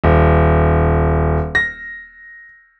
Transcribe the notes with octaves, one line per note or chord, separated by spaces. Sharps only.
D#1
A#6